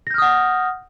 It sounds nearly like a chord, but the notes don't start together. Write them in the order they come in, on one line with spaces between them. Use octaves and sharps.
A#6 G6 F6 D#6 F#5